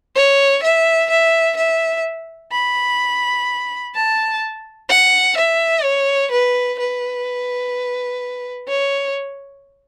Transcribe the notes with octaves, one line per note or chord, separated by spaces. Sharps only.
C#5
E5
E5
E5
B5
A5
F#5
E5
C#5
B4
B4
C#5